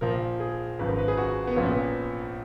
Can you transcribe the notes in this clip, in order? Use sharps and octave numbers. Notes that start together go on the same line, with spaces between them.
A#1 A#2 F3 A#4
G#4
G#1 F#2 F3 B4
A#4
B4
G#4
F#4
B3
A#1 A#2 F3 C#4
B3